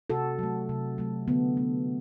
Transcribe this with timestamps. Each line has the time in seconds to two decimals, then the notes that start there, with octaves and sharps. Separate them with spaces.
0.10 C3 F#4 A4
0.39 F#3 A3
0.69 C3
0.98 F#3 A3
1.28 D3 B3
1.57 A3